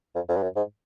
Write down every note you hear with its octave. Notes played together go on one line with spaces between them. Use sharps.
F2
F2
G2
F#2
G#2